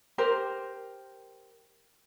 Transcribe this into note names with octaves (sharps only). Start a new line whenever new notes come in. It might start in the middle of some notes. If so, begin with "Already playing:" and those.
G4 A#4 C5